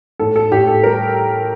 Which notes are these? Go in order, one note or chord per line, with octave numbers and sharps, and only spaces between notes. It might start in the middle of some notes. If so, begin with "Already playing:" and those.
A2 A4
A4
A2 G4
A4
G3 A#4